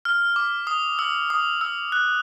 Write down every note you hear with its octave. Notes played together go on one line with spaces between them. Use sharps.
F6
D6
D#6
E6
D#6
E6
F#6